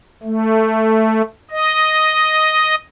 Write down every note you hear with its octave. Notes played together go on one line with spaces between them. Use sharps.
A3
D#5